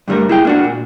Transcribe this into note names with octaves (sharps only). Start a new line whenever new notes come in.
G2 D3 G3 A3 A#4
E4 G#4 G5
A#3 D4 F#4
A#2